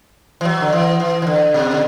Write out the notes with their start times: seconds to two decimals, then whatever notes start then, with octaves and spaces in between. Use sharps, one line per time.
0.41 E3
0.45 F#3
0.61 D3
0.73 E3
1.00 E3
1.22 E3
1.27 D3
1.54 B2
1.71 D3